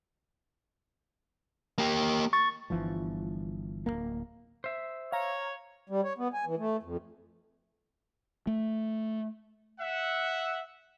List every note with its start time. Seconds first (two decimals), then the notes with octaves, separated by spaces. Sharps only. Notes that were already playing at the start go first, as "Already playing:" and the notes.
1.78 A#3 G4
2.33 C#6 A6
2.70 G1 E3 F3
3.86 D1 E2 A#3
4.64 C5 E5
5.12 C#5 F5 A#5
5.90 G3
6.04 C#5
6.18 B3
6.34 G#5
6.46 E3
6.58 A3
6.83 F2
8.47 A3
9.80 E5 F#5